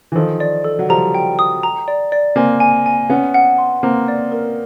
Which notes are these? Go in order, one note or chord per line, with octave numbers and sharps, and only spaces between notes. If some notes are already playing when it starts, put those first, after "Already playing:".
E3
D#3 F3 A4
D5
A4
F#3
F3 G3 A#5
G5
D#6
A#5
D5
D5
A#3 C4 G#5
G#5
G#5
B3 C#4 F#5
F#5
C6
A#3 C4 A#5
D5
A#4